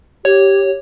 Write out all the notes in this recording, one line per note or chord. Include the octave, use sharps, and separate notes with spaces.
G4 C#5